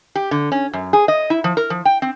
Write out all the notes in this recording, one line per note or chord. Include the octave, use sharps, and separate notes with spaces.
G4
D3
C#4
F#2
G#4
D#5
E4
F3
A#4
F3
G5
C4